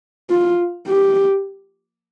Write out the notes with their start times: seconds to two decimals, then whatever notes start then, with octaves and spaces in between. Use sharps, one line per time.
0.30 F4
0.87 G4